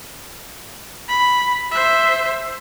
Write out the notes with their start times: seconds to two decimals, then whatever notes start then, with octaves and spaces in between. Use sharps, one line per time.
1.08 B5
1.71 C5 E5